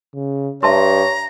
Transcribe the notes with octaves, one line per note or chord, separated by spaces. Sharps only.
C#3
G2 C#5 E5 A5 A#5 C6